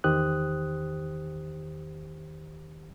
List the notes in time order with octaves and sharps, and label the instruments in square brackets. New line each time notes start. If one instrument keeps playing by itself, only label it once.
[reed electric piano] E2 D#3 G4 C5 D#6 F#6